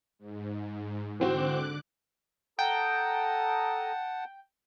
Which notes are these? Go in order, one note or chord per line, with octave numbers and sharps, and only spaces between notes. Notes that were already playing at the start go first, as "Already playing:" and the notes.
G#2
D3 E3 C4 F#4 D6 F#6
A4 F#5 G5 A5 A#5 D#6